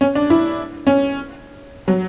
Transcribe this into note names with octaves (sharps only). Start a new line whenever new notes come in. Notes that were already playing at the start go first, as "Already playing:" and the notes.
C#4
D4
E4
C#4
F#3